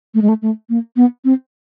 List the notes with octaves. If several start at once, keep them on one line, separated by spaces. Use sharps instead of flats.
A3
G#3
A3
A3
A#3
B3
C4